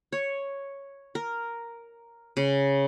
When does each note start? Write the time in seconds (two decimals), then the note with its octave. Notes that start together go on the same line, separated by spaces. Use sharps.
0.12 C#5
1.15 A#4
2.37 C#3